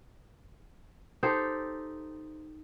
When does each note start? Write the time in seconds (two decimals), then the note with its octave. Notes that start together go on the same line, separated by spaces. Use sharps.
1.23 D#4 G4 A4 C5